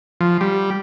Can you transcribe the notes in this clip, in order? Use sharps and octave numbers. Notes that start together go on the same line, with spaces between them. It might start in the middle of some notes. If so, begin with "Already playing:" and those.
F3
G3